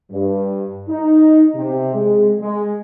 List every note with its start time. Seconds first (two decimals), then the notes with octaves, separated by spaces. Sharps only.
0.11 G2
0.89 D#4
1.56 C3
1.94 G#3
2.39 G#3